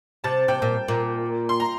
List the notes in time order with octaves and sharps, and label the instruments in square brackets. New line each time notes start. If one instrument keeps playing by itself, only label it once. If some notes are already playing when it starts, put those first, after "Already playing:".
[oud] C3 [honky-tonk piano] A5 A6
[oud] C3 [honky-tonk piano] G5 G6
[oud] A#2
A#2
[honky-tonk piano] C6
A#5